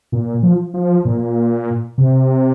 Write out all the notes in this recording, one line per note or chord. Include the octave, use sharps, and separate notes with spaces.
A#2
F3
F3
A#2
C3